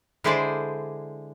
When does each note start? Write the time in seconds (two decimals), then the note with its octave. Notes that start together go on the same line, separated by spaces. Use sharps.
0.24 D3 G#3 E4 G#4 C5 D5